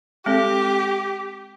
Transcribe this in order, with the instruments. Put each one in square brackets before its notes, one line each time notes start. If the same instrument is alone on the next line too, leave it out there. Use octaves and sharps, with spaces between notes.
[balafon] G#3 C4 A4 [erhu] G4